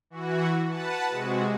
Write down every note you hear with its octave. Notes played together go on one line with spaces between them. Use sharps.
E3 F#4
B4 F#5 A5
C3 G#3 F#4